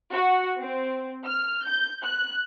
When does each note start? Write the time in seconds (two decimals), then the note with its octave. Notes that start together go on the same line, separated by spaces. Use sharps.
0.12 F#4
0.59 C4
1.26 F6
1.65 G6
2.03 F#6